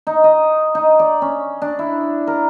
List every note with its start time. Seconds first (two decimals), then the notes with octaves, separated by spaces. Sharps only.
0.07 D#4
0.24 D#5
0.75 D#4
0.99 D5
1.22 C#4
1.62 D4
1.79 E4
2.27 A#4